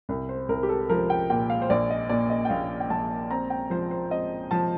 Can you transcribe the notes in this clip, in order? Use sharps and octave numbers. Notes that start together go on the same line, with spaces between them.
C2
C5
C2 A#4
G4
A4
F3 A#4
G5
A#2 G5
F5
C5
A#1 D5
D#5
A#2 D5
D#5
G5
A#1 F5
G5
A#1 A5
C4 A#5
G5
F3 C5
C5
C4 D#5
F3 A5